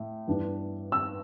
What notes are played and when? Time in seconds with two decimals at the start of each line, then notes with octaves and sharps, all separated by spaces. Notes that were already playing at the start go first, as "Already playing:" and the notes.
Already playing: A2
0.27 G2 E3 B3 D4
0.92 E6